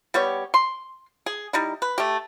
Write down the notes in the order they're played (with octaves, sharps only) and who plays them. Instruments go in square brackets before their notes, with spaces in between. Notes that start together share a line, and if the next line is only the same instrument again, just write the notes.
[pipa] G3 B3 G4 C#5
C6
G#4
G3 D#4 E4
B4
A3 G4